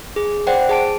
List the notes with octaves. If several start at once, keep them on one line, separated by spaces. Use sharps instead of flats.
G#4
C5 D5 F#5 G5
G#4 A5 D7